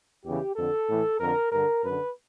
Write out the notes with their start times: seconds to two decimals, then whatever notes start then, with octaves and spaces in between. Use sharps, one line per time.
0.24 E2 C#3 E3 G4
0.56 F2 D3 A4
0.88 A2 E3
1.20 F2 D3 A#4
1.52 G2 D3 A#4
1.84 F#2 D3 B4